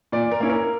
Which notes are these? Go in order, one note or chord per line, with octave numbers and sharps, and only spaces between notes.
A#2 D5
A#4
A#3 C#4 E4
A#4